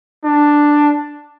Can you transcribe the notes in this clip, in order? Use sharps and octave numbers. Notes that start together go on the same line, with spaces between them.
D4